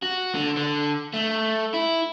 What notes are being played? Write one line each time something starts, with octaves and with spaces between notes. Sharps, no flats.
F#4
D3
D3
A3
E4